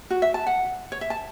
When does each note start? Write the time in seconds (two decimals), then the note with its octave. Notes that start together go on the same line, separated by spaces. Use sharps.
0.10 F#4
0.22 E5
0.34 A5
0.47 F#5
0.92 C#5
1.01 E5
1.10 A5